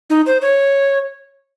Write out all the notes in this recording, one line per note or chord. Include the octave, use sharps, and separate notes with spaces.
D#4
C5
C#5